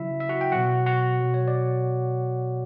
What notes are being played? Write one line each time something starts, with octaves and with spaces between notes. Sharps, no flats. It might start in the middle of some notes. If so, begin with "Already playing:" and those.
Already playing: C#3 F#3 E4 E5
E5
F#4 F#5
G5
B2 F#3 F#4 F#5
F#4 F#5
B2 F#3
C#5
D5